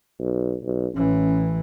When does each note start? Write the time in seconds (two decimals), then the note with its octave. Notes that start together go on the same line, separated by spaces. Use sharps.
0.19 B1
0.64 B1
0.96 A1 E3 C#4